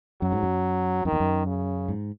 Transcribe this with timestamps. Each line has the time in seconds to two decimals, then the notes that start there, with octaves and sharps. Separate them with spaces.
0.22 F#2 F#3
0.32 G#2
0.43 F#2
1.05 F#2 D#3
1.12 E2
1.20 F#2
1.47 C#3
1.89 G#2